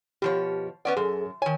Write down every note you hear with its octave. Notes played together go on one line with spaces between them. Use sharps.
B2 F3 G4 C#5
B3 C#4 D5 F#5
F#2 G#4 A4
D#3 C#5 G#5